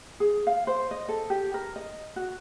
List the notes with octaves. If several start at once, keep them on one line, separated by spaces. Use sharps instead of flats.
G#4
F5
C5
D#5
A4
G4
A#4
D#5
F#4